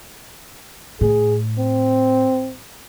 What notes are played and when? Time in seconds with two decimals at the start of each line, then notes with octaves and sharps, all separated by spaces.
1.01 A2 G#4
1.58 C4